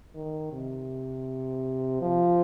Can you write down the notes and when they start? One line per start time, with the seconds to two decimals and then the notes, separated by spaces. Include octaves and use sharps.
0.15 D#3
0.52 C3
2.02 F3